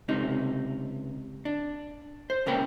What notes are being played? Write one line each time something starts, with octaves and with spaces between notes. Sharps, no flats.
C#2 C3 D#4
D4
C5
C#2 A#2 C#4 A#4 G5 B5